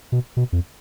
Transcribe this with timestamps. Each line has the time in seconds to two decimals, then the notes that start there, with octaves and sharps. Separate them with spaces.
0.12 B2
0.37 B2
0.52 F2